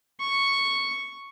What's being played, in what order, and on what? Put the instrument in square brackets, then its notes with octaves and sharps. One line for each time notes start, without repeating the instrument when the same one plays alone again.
[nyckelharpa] C#6